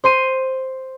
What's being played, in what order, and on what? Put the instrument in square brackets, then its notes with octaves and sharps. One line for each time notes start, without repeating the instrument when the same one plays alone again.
[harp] C5 C6 D#7